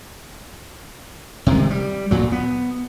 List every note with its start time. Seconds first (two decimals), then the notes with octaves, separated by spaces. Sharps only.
1.46 C3 D#3 G#3
1.71 G3
2.11 D2 A#2 F#3
2.32 B3